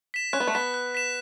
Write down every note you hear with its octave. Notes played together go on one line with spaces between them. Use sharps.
B6 E7
C#4 F#6
B3
A3
B3 B6 E7
F#6
B6 E7